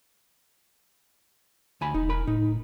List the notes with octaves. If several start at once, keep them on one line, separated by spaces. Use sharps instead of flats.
D2 G#5 B5
E1 D#4
A#4 B5
A2 D#4